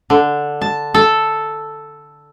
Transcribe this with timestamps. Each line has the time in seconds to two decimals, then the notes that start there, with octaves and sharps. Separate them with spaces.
0.10 D3
0.62 A5
0.94 A4